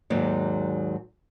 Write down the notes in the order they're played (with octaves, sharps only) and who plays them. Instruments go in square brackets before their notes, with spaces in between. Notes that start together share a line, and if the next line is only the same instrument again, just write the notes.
[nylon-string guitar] D#2 G#2 F#3 G#3 D#4 D5